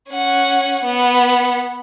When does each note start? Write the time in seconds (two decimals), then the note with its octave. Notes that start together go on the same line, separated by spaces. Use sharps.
0.11 C#4 F#5
0.84 B3